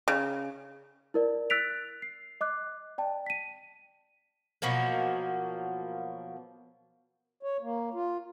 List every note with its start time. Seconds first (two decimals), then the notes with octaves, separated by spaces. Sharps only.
0.08 C#3
1.14 E4 A#4 D5
1.50 E6 F#6 A6 B6 D7 F7
2.02 C7
2.41 D#5 D6 F#6
2.98 D5 G5 A5
3.26 B6 D#7
4.62 B2 F3 F#3 A#3
7.43 C#5
7.61 A#3
7.94 F4